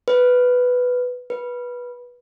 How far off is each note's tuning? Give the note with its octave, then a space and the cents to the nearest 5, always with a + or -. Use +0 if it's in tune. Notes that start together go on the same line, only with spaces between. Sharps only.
B4 +5
B4 -15